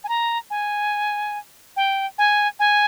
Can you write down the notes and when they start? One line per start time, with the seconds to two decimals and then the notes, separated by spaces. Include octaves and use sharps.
0.04 G#5
0.09 A#5
0.50 G#5
1.76 G5
2.18 G#5
2.59 G#5